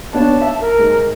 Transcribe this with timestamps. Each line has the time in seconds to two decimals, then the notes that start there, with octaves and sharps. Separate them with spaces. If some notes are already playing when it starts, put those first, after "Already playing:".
0.13 B3 D4 C#5 A5
0.41 E5
0.61 A#4
0.79 G#2